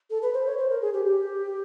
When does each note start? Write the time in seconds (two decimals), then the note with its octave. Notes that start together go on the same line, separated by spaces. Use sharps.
0.10 A4
0.22 B4
0.34 C5
0.46 C#5
0.58 C5
0.70 A#4
0.82 G#4
0.94 G4
1.06 G4